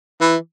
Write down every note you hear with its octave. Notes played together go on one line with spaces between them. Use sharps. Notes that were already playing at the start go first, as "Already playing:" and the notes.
E3